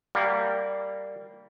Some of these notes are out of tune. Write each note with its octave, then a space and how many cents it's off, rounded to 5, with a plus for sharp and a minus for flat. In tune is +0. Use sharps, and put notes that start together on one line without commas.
G3 +0 A#3 -20 F#5 +0